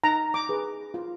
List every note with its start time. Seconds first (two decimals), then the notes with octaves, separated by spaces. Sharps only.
0.04 D#4 A#5
0.34 D6
0.49 G#4 B4
0.94 F4